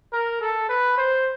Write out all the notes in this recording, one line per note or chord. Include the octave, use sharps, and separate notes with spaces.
A#4
A4
B4
C5